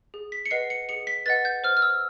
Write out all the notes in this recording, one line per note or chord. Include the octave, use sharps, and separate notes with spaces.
G#4
B6
C#7
B4 D#5 F#5 C7
C#7
G#4 C#7
B6
B4 D#5 F#5 A6
G6
C5 F6
F6
E6